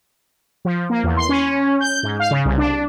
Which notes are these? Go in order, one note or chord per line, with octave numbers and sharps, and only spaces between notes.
F3
A#3
E2
C6
C#4
G6
G#2
F5
C#3
C2
D4